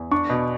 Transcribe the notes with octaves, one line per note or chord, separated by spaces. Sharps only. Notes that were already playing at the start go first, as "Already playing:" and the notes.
Already playing: E2
D4 C#6
B2